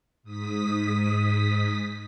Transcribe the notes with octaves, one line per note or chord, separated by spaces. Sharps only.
G#2 D#6 B6